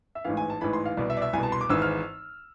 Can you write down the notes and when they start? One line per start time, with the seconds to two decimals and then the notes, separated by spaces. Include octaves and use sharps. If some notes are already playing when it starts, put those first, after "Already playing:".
0.15 E5
0.25 A1 G#2 E3 F5
0.37 G#5
0.50 A5
0.61 A1 G#2 E3 B5
0.73 C6
0.86 F5
0.97 C2 B2 D5
1.10 E5
1.17 D5
1.22 E5
1.33 C2 G#5
1.38 B2
1.43 A5
1.52 C6
1.61 D6
1.69 G#1 G#2 E3 E6
1.82 F6